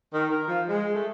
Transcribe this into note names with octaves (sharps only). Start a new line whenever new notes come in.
D#3
A#4
F3
G#3
A3